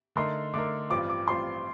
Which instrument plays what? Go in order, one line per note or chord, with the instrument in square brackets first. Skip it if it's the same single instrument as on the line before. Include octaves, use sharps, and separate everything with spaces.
[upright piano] D3 A3 D#4 A#4 [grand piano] C6
[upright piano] D3 A3 D#4 A#4 [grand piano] D6
[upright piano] A1 G2 F3 C4 F4 [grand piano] D6
[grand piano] D6
[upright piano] A1 G2 F3 C4 F4 [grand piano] C6